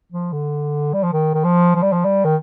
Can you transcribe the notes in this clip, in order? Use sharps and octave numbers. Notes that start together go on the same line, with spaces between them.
F3
D3
G3
F3
D#3
D#3
F3
F3
G3
F3
G3
D#3